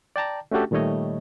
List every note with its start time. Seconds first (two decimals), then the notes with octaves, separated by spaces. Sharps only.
0.16 D5 G5 A5 A#5
0.51 A3 C#4 D4 F#4 G4 A4
0.71 A#2 D#3 G3 A3 C#5 D#5